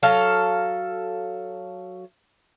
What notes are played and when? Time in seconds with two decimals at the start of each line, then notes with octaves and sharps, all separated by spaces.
0.03 F#3 A4 F5